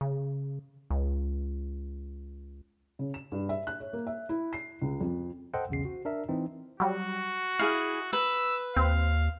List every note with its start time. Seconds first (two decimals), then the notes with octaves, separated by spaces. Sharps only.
0.01 C#3
0.90 C#2
2.99 C#3
3.14 E7
3.32 G2
3.49 E5
3.67 F#6
3.80 C#5
3.93 A#3
4.07 E5
4.29 E4
4.53 C7
4.82 C#2
5.01 F2
5.54 A4 C5 D#5 F#5 G5
5.69 B1 E2 C#3 C7
5.85 F#4
6.05 D4 A#4 E5
6.28 E3 C4 D#4
6.80 F#3 G3 F#4
7.59 E4 G#4 F5
8.13 B4 E6
8.77 D#2 C4 F5